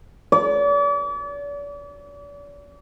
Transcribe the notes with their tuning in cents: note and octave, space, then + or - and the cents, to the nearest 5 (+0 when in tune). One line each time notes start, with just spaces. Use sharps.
D5 -40